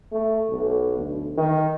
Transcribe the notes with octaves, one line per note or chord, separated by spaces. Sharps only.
A3
B1
D2
D#3